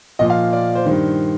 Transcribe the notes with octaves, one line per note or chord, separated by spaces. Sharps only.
A#2 F3 D#5
F5
D5
C5
G2 D#3 C5